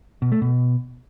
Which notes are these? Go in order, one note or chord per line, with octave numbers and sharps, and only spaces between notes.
B2
A3
B2